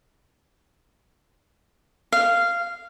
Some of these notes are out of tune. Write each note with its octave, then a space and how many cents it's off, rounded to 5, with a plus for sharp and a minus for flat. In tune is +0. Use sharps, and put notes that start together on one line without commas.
F5 -10